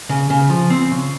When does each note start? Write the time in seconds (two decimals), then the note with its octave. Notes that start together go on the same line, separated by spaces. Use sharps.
0.09 C#3
0.30 C#3
0.50 F3
0.70 C4
0.91 C#3